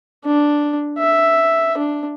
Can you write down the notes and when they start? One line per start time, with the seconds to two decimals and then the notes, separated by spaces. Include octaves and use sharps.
0.25 D4
0.99 E5
1.77 D4